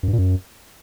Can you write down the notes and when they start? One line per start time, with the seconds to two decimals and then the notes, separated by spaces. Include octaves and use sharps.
0.03 F#2
0.08 G2
0.13 A#2
0.18 F#2